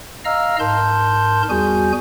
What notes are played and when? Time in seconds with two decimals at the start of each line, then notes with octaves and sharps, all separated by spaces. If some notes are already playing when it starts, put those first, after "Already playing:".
0.25 D#5 F5 A#5 E6 F6
0.59 G#2 A#4 A5 C6 G6
1.50 E2 G3 F#4 G#4 G#5 G6